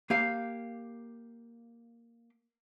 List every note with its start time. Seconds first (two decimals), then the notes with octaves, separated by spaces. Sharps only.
0.10 A#3 G4 F5